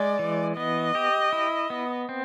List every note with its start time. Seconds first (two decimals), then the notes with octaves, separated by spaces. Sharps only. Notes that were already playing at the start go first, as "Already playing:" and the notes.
Already playing: G#3 D5
0.19 E3
0.57 B3 D#5
0.95 G4
1.33 E4
1.70 B3
2.09 C4